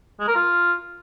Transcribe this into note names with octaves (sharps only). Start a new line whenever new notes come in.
G#3
A#4
F4